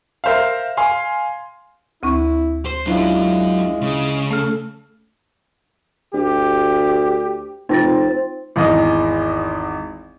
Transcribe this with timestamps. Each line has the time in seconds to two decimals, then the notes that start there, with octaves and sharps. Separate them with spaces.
0.24 A#4 C5 E5 F5
0.77 F5 G#5 C6
2.03 D2 C4 E4 C#6
2.65 C5
2.86 F#2 F#3 G#3 D4 E4 F4
3.81 C#3 G#3
4.31 A3 A4 F6
6.14 D2 G4
7.69 F1 C4 D#4 F4 A6
8.56 G#1 E2 D#5